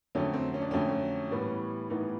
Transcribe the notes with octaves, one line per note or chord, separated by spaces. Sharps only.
F2 D3 F#3 A3 C#4
C4
C#4
D4
F2 D3 F#3 A3 C#4
A2 E3 G3 B3
A2 E3 G3 B3 D#4